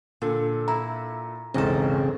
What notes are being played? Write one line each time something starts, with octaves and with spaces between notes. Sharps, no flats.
A#2 D3 A4
E4 A#5
B1 E2 G#2 C#3 C4 A4 D#5